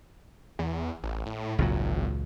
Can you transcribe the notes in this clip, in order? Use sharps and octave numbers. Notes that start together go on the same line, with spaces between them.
E2
A1
A2
G#1 C#2 A#2 F#3